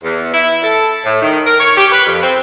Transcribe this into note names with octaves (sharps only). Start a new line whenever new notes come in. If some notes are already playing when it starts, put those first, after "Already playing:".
E2
E4
A4
A2
D#3
A#4
C#5
G4
B4
F2
C4